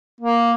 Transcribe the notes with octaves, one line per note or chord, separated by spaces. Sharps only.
A#3